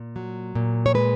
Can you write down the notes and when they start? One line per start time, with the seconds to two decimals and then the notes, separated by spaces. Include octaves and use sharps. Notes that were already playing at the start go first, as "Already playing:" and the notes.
Already playing: A#2
0.16 F#3
0.55 A#2
0.86 C#5
0.94 G#3 B4